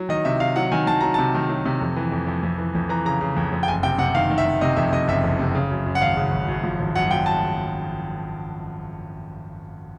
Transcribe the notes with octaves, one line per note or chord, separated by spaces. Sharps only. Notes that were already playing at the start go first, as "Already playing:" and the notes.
Already playing: F#3
D#3 D#5
C3 E5
C3 F5
F#3 F#5
D#3 G#5
D#3 A5
F#3 A#5
C3 A5
D#3
F#3
C3
F2
E3
F2
F2
F2
E3
F2
E3 A#5
C#3 A#5
C#3
F2
F2
G5
F#1 G#5
C3 G5
C3 F#5
D#3 F5
D#3
E5
D#3
C3 D#5
F2 E5
C3 D#5
F#1 E5
F2
C3
C#3
F#2
F#2
F#5
G#1 F5
C#3
G#1
F#2
F3
G#1
F#2 F#5
F3 G5
A5